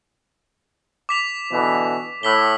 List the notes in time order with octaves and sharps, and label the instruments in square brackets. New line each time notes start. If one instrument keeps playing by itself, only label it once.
[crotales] D6 B6 F7
[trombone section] B2 D3 E3
[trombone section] A2 [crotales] E6 B6 G7